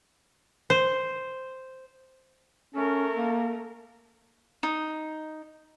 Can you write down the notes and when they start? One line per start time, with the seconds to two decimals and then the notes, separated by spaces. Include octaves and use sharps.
0.70 C5
2.75 A3 C#4 A#4
3.15 A#3
4.63 D#4